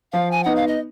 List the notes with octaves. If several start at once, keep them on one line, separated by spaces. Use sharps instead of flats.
F3 F5
G#5
B3 D#4 F#5
F5
D#5